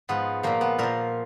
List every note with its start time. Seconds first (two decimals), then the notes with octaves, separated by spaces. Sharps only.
0.09 G#2 F3 B3
0.43 A#2 F3 A#3
0.61 B3
0.79 A#2 F3 A#4